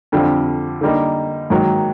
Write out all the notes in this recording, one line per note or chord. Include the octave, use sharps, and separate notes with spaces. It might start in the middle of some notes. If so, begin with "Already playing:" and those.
F2 D3 G3 C4
D3 G3 A#3 D#4
G#2 D#3 F#3 A#3